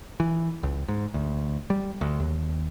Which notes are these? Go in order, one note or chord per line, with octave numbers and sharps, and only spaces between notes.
E3
C#2
G#2
D2
G3
D2
D#2